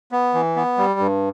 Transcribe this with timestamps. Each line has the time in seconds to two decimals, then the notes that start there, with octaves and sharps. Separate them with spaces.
0.12 B3
0.34 E3
0.56 B3
0.78 G3
1.00 G2